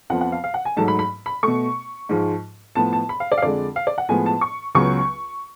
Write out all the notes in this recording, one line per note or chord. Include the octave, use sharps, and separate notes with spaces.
F2 F3 B3 F#5
F#5
F5
F5
F#5
G#5
G#2 F#3 A3 A5
B5
B5
B5
B2 A3 C#6
G#2 F3 G#3
A2 F3 B3 A5
A5
B5
F5
D5
F5
F2 D3 G#3 D5
F5
D5
F#5
A2 F3 G#3 B3 G#5
A5
C#6
C#2 C#3 F#3 B3 C#6